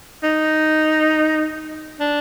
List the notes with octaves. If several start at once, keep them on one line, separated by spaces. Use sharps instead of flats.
D#4
D4